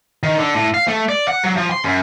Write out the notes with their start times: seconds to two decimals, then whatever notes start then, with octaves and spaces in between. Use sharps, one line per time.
0.23 D#3
0.37 D3
0.55 A2
0.74 F5
0.88 A3
1.09 D5
1.28 F#5
1.44 F#3
1.56 F3
1.70 C6
1.84 F#2